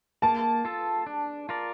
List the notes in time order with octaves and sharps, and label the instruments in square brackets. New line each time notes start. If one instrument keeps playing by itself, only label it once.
[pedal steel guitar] A#3 [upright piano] A5
[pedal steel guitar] F4 A4
D4
F4 A#4 D5